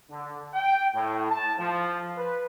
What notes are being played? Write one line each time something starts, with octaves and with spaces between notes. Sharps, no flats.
D3
G5
A2
A5
F3
B4